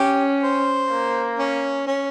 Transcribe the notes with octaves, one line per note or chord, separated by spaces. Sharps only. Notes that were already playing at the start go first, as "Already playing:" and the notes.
Already playing: C#4 G4
C5
A#3
C#4
C#4